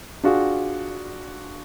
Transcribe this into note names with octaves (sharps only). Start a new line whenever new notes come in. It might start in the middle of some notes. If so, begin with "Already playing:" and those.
D4 F4 F#4 G#4